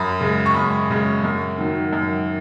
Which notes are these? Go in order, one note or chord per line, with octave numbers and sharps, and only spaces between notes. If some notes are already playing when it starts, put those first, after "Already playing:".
Already playing: F#2 B5 D#6
C#3 G#3
C#6
F#2 B5 D#6
C#3 G#3
F#2
D#3 F#3
F#2